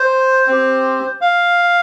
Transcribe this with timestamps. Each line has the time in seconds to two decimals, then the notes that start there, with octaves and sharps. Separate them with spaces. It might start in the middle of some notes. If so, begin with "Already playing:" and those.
Already playing: C5
0.47 C4 G4
1.21 F5